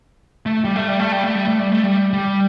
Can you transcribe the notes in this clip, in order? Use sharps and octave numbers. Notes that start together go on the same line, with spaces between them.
A3
G3
A3
G3
A3
G3
A3
G3
A3
G3
A3
G3
G3